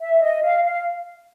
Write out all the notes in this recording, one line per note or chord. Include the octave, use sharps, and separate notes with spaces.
E5
D#5
F5
F5